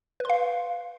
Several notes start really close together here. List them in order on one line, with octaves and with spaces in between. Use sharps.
B4 C6 F5